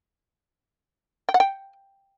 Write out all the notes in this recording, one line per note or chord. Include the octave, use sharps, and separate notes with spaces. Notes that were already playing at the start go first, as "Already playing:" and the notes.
G5
F#5
G5